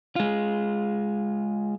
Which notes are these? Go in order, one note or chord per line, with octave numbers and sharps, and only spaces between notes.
G#3 F4